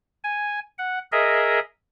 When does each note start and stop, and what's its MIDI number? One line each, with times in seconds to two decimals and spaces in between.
0.24 0.60 80
0.78 0.99 78
1.12 1.60 68
1.12 1.60 70
1.12 1.60 75
1.12 1.60 76